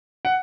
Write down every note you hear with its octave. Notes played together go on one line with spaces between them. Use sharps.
F#5